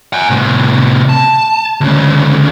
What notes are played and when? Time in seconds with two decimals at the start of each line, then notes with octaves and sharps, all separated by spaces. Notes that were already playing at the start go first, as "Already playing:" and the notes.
0.13 F#5 G#5
0.30 A2 C3
1.09 A5
1.81 D2 C#3